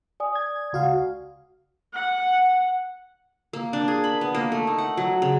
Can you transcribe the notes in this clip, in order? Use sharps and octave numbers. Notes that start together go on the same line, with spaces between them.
D5 G#5 D#6
G#6
C#2 F#4 F5
F#5
A#3
D4
G#4
B5
B3
A#3
A3
D#4
F#5
F#3
C#3